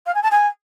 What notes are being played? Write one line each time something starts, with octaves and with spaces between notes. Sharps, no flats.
F5
G#5
A5
G#5